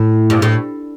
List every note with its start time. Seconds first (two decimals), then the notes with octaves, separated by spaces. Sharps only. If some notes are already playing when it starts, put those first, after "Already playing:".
Already playing: A2
0.30 G2
0.42 A2